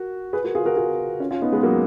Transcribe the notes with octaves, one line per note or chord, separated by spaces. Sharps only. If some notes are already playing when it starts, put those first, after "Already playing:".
Already playing: F#4 A#4
G#4 B4
F#4 A#4
F4 G#4
F#4 A#4
F4 G#4
C#4 F4
C#4 F4
B3 D#4
G#3 B3
F#3 A#3